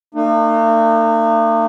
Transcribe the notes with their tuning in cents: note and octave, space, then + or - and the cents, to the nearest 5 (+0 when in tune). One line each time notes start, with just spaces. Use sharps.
A#3 -45 D#4 -40